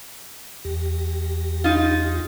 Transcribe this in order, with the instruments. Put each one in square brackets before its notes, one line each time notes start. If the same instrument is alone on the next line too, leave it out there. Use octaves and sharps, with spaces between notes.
[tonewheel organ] E2 G4 A#6
[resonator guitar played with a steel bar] D#4 F4